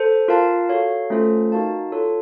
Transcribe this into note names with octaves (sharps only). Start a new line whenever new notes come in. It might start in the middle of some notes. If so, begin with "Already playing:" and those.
Already playing: A4 C5
F4 A#4 F5 A5
F#4 A4 C#5 F5
A3 C#4 F4 A4 C5
D#4 F#4 A#4 F5 A5
F4 A4 C#5